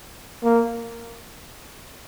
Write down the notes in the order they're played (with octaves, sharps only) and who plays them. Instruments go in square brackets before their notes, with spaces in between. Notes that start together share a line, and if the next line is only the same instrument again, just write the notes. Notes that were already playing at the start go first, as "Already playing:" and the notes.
[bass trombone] A#3